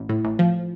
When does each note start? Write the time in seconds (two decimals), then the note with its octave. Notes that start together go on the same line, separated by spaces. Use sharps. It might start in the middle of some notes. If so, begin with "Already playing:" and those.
Already playing: A1
0.09 A2
0.25 A1
0.39 F3